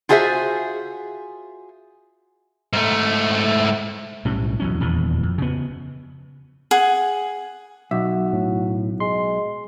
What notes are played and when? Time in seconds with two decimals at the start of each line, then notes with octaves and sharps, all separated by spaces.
0.09 F4 F#4 G#4 C5 D5 E5
2.73 G#2 A3
4.25 B1 A2 G3 C#4
4.60 E2 F#3 C#4
4.80 D#1 E2 B2 E3
5.23 F2
5.38 C#3 B3
6.71 G#4 F#5
7.91 B1 F#4 E5
8.33 A2
9.00 G#3 C6